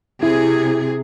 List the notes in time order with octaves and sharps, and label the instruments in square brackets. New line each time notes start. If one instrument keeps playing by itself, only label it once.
[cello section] C3 G#4 [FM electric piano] E4